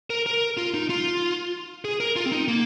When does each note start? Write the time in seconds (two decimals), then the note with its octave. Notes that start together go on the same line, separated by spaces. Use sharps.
0.10 A#4
0.26 A#4
0.57 F4
0.74 D#4
0.90 F4
1.85 G#4
2.00 A#4
2.16 F4
2.26 C4
2.32 D#4
2.48 A#3